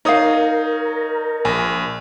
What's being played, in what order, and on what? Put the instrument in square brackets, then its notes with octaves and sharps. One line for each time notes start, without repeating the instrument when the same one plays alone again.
[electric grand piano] D#4 C#5 D#6 [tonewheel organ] A#4 [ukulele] D5 F5
[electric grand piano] A#1 [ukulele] G#5